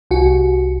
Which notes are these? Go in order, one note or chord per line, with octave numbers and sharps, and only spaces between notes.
C2 F#4